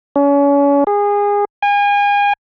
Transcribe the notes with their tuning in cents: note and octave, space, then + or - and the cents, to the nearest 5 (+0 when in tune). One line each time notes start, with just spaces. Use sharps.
C#4 +35
G#4 -25
G#5 -35